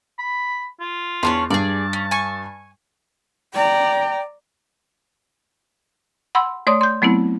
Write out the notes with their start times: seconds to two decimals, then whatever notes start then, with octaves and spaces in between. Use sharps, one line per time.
0.18 B5
0.80 F4
1.23 E2 C#4 D4 C#5 C6
1.50 G2 G#4 D5 A5
1.93 C#4
2.11 G#5 C#6
3.54 D5 G5 A#5
6.35 F#5 B5 C6 E6
6.67 A3 C#5 D5 C6 D#6
6.81 C6 G6
7.02 F#3 A3 B3 C4 E4